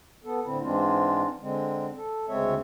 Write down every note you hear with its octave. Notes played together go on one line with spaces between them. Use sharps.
B3 A4
A2 D3 C4 E4
G#2 E3 G#3 C4 D4 F4
D3 G#3 C4
A4
D2 C#3 G#3 C4 C#5 E5